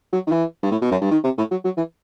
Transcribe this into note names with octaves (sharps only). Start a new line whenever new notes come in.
F#3
D#3
E3
G2
A2
B2
F#2
G2
D#3
C3
A2
F#3
F#3
E3